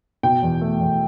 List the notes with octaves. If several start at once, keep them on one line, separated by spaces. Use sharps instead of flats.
B2 G5
E2
A3
E2